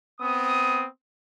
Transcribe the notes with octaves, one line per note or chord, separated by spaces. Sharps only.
B3 C4 D#6